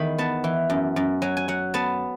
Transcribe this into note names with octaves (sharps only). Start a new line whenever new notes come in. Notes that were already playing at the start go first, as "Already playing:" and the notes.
Already playing: E2 D#3 B5
B3 A5
E3
F#2
F#2
F#3 G#5
G#5
F#3 F#5
B3 A5